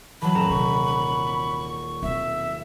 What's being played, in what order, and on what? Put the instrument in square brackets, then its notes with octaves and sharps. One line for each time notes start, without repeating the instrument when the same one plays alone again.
[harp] E3 F#3 [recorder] A5 [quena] B5
[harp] D#1 A#5 E7
[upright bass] C3 [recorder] C#6
[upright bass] B2 C4 [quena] E5